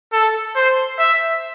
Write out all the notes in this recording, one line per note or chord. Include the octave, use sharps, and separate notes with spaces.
A4
C5
E5